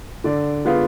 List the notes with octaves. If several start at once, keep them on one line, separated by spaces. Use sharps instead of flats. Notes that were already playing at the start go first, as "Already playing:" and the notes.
D3 D5
G#3 B3 F4